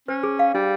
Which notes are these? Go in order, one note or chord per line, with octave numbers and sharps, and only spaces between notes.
C#4 C5
G#4
F5
G3 D4